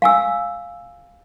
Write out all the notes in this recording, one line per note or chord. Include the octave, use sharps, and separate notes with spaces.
F5 G#5 E6